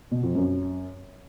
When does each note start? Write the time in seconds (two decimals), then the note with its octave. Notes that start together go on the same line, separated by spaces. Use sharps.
0.11 B2
0.23 F2
0.35 F#2